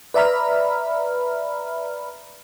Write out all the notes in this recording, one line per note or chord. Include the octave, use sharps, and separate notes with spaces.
B4 D5 E5 A#5 B5 F6